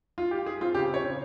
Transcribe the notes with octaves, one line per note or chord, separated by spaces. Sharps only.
F4
F4 G4
F4 G#4
C4 F4
C#3 G4
C4 C#5
C#3